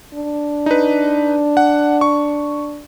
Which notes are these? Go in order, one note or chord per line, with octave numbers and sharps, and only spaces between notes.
D4
D#4 B4
F#5
C#6